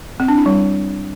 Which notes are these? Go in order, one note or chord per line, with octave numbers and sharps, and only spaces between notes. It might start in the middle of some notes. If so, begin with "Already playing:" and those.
C4
D4
E4
G3